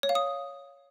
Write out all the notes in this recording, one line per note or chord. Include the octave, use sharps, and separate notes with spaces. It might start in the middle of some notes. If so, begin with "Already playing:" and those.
C#5
F5
D#6